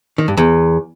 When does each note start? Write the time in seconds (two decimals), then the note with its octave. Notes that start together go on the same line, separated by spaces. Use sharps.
0.18 D#3
0.28 G2
0.37 E2